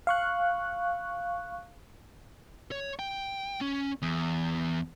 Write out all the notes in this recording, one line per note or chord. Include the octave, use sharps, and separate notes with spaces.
F5 C#6 F#6
C#5
G5
C#4
E2